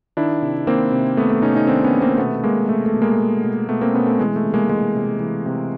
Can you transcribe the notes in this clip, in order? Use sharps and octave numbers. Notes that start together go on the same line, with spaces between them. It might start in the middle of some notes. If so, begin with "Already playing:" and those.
D#3 D4 E4
C3
D#3 A#3 C4
C3
D#3 A3 B3
A3
C3 C#4 D#4
C#4 D#4
D#3 C4 D4
B3 C#4
C3
A#3 C4
B2 A3 B3
B2 G#3 A#3
B2 A3
A3
B2
G#3 A#3
B2
B2
B2 A3 B3
A#3 C4
B2 B3 C#4
A3
E3 G#3
A3
C3
G#3 A#3
E3 G#3
C3
E3
C3